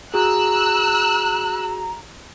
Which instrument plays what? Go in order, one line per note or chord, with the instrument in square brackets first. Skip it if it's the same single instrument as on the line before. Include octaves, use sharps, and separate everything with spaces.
[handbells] F#4 G#4 [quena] A#5 [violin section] E6 F#6